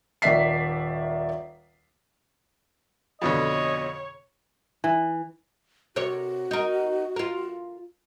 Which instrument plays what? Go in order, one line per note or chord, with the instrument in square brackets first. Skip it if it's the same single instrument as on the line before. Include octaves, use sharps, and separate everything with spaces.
[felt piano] D#1 D#3 D5 E5 B6 C7
[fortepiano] F2 B2 D3 [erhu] C#5 [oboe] D#5
[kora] E3
[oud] C3 A#4 C#5 [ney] F#4
[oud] D#4 A#4
F4 A#4